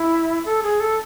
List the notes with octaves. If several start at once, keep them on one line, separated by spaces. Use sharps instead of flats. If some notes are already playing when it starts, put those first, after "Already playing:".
Already playing: E4
A4
G#4
A4